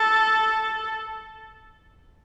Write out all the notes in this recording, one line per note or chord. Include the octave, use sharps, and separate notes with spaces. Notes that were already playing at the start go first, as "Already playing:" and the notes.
Already playing: A4